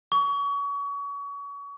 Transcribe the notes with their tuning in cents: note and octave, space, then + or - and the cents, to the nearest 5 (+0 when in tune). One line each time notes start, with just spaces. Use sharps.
C#6 +30